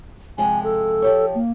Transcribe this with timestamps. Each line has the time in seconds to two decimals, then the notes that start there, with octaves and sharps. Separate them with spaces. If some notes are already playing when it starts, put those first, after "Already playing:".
0.38 C3 F3 G#3 G#5
0.64 A4
1.02 F3 G4 C#5
1.35 A#3